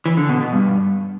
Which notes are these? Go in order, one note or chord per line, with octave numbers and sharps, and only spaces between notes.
E3
D3
B2
B2
G2